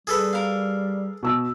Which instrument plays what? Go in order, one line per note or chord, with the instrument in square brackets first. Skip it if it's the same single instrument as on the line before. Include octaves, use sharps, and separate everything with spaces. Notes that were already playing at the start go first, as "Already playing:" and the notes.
[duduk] G3 [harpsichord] G#4 A4 B4
[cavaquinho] A#4 F5
[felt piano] B2 E6